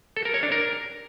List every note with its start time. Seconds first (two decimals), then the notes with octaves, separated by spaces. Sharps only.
0.16 A4
0.25 A#4
0.34 C#5
0.43 D4
0.52 A#4